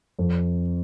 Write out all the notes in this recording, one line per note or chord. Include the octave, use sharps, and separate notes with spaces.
F2